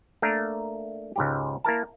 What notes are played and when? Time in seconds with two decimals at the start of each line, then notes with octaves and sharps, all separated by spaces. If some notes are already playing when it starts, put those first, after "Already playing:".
0.22 A3 A#3 D4 A#4
1.16 C#2 G#2 G4
1.64 A#3 E4 A#4 A5